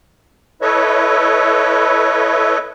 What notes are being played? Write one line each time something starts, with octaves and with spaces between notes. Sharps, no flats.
E4 A4 B4 C#5 D#5 E5